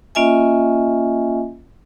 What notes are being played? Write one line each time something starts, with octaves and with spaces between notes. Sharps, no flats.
A#3 C#4 F4 D#5 E5 G#5